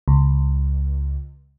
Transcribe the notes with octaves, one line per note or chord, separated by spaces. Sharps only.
C#2